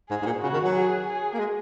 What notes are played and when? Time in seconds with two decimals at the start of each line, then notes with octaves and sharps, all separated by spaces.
0.10 G#2 G#4
0.22 G#2
0.25 A#2
0.41 C#3 F#4
0.53 D#3
0.64 F#3
0.75 G#4
1.07 G#4
1.34 A#3
1.39 G#3